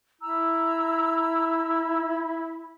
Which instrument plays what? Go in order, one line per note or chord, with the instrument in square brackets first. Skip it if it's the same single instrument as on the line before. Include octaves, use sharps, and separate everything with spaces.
[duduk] E4 [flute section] A#5 E6